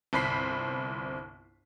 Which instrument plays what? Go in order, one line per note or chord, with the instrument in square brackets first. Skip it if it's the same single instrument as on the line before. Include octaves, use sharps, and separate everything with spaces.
[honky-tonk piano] G1 C2 C5 B5 B6 C7